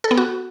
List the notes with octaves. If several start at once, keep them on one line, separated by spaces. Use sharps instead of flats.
A4
B3
F#4